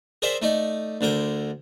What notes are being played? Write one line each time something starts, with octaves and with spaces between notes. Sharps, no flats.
G#4 A#4 C5 D5 E5 G5
A3 D#4 D5
D2 D3 A#4 G5